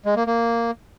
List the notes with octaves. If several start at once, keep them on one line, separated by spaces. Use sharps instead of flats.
G#3
A#3
A#3